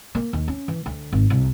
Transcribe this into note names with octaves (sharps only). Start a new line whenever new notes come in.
A#3
D#2
C#4
E3
D2
G#1
C2